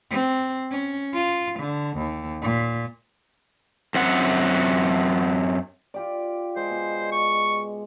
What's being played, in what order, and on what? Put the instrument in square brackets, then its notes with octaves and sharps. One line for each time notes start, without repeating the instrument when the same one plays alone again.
[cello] C4
C#4
F4
D3
D#2
A#2
[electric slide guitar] F#2 C4 F#5
[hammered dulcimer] F4 G4 D5
[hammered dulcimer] G#3 [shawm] C5
[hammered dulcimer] B2
[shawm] C#6